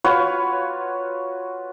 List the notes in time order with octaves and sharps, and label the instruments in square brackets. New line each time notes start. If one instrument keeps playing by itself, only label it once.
[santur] F4 F#4 B4 C#5